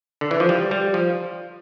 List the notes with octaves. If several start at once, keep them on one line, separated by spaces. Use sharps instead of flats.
D3
E3
F3
G3
G3
F3